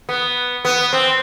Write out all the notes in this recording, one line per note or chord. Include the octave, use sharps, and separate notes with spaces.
B3
B3
C4